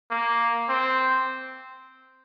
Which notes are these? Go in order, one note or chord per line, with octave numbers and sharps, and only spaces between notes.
A#3
C4